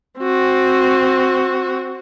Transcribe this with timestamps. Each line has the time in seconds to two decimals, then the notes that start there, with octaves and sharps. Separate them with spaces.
0.19 C4 F#4